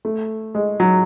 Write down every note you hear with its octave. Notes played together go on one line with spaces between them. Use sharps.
A3
G#3
F#3